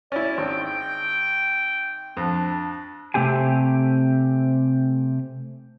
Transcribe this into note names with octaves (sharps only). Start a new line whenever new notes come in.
C#4 E4 D5
G#1 G5
F2 D4
C3 A3 C4 G4 G#5